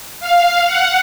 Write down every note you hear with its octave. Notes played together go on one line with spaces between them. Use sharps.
F5
F#5